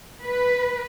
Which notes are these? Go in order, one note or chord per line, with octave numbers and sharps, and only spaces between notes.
B4